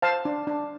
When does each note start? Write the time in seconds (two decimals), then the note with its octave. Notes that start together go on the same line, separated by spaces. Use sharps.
0.02 C5 F5 A5
0.25 D4
0.47 D4